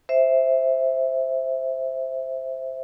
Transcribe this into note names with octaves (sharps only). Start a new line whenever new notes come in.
C5 E5